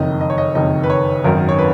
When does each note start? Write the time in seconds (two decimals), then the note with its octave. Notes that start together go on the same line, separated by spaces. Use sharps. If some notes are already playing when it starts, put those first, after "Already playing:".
Already playing: F#1 F2 D#3 D#5
0.21 D#5
0.30 C#5
0.38 D#5
0.55 F#1 F2 D#3 D#5
0.83 B4
0.90 C#5
1.24 G#1 F#2 D#3 A#4
1.49 C#5
1.59 B4